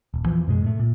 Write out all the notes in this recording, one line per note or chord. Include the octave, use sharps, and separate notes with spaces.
D#1
E2 E3 F3
F#2 B2 G#3
A2 G#3 A3
A#2